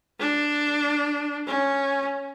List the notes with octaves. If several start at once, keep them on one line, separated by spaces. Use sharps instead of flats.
D4
C#4